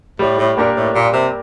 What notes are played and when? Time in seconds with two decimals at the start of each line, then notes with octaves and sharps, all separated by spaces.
0.19 A2 G3
0.38 A2
0.57 A#2 A#3 D4 G4 A#4
0.76 A2
0.95 A#2 G3
1.13 C3